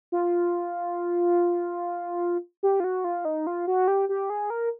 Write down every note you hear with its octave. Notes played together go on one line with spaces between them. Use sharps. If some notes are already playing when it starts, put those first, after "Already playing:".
F4
G4
F4
F#4
F4
D#4
F4
F#4
G4
G4
G#4
A#4